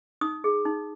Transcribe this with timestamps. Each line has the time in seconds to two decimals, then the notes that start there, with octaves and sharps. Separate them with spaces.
0.21 D#4 D#6
0.44 G#4
0.65 D#4